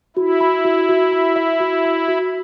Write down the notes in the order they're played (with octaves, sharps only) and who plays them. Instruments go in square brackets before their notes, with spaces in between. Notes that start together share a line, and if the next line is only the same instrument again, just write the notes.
[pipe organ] E4 [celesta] F#4
[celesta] B5
F#4
F#4
B5
E5
F#4
B5
F#4